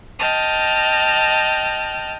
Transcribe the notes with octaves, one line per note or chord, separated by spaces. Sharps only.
D#5 G5 A5 F6